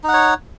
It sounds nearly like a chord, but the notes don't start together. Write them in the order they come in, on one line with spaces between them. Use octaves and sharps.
D#4 F#5 C#5